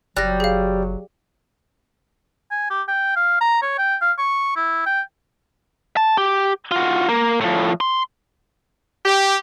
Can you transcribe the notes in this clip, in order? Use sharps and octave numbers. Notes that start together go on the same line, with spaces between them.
F#1 F#3 G3 F#6 A#6
G#4 F5
G#5
G4
G5
F5
A#5
C#5
G5
F5
C#6
E4
G5
A5
G4
F4 F#4
A#3
A2 F3
C6
G4